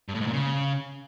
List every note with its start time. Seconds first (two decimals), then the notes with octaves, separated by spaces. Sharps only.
0.08 G2
0.15 A2
0.21 G#2
0.27 A#2
0.33 C#3